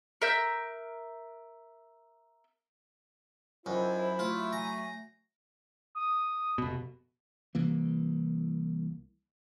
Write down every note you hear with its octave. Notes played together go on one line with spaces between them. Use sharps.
A#4 E5 G6
F#2 D#3 F#3 E4 F4 C5
F#3 A3 F4
G#5 A#5
D#6
F1 B2
C2 E3 A#3